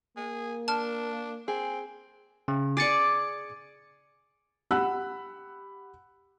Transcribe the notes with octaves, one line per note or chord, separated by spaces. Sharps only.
A#3 G#4
D4 A5 F6
C4 G#4
C#3
G#4 D5 D6 A6 C#7
G4 F#5 B5 E6 F#6